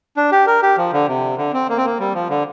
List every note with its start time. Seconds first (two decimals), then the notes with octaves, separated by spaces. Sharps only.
0.17 D4
0.32 G4
0.47 A#4
0.62 G4
0.78 F3
0.93 D3
1.08 C3
1.38 D3
1.53 C4
1.69 A#3
1.77 C4
1.86 A#3
1.99 G3
2.14 F3
2.30 D3